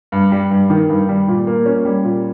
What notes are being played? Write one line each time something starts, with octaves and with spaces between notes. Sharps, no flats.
G2
G3
G2
D#3
G2
G3
A#2
A#3
C#4
G3
A#2